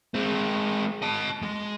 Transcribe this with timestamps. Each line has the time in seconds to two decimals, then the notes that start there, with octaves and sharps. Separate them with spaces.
0.15 G#3 C4
1.02 D#5 A5
1.42 G#3